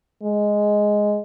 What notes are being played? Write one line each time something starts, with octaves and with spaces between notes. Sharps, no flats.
G#3